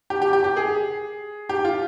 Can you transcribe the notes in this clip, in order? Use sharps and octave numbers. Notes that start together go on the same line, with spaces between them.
G4
G4
G4
G4
G#4
G4
F4